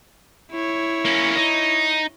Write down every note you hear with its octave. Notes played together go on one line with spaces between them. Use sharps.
E4 C#5
A#3 C#4
D#4